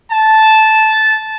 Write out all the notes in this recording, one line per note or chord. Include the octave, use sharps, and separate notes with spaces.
A5